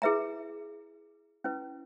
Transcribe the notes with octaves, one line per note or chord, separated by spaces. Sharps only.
E4 G#4 B4 E5 A#5
C#4 E4 B4